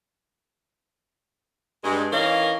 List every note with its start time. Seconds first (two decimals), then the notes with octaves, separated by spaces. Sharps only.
1.84 G2 G#3
2.12 D#3 E3 C#4 A#4 D#5 F5